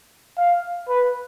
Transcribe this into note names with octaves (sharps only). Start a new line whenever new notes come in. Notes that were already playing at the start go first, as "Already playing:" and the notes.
F5
B4